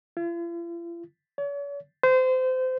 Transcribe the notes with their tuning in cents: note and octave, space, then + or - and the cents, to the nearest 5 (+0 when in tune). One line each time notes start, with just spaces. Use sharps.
F4 -45
C#5 +45
C5 -25